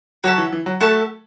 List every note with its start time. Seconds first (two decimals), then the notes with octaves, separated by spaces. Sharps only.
0.24 F#3 F#4 C#5 E5 A5
0.38 E3
0.52 E3
0.66 F#3
0.81 A3 F#4 A4 E5 A5